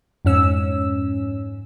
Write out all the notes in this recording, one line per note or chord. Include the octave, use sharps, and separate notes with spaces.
F2 G#2 C#4 E6